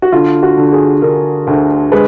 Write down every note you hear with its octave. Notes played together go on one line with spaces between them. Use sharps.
F#4
D3 F4
F#4
D3
G#4
D3 A#4
D2
G#3 B4